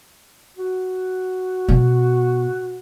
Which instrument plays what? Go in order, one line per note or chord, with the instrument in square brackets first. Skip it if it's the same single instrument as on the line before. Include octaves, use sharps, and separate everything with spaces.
[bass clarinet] F#4
[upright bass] B2